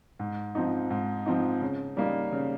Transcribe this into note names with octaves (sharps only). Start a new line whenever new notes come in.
G#2
F3 C4 D#4
G#2
F3 C4 D#4
C#3
G3 A#3 D#4
C#3